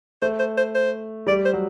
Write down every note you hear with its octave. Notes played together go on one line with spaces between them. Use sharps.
A3 C5
C5
C5
C5
G3 D5
C5
F#3